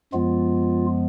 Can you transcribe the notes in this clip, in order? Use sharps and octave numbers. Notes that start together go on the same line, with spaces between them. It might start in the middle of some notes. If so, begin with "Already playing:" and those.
F#2 F3 G#3 B3 F4